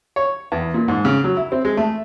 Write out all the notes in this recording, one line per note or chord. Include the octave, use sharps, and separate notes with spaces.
C#5
E2
A#2
G#2
C#3
F#3
E4
C4
G#3
A3